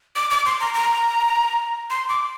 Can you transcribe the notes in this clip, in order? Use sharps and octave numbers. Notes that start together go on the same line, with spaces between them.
D6
D6
C6
A#5
A#5
C6
D6